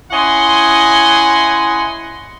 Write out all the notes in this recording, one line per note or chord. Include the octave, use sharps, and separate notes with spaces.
C#4 E4 D#5 F#5 G#5 C6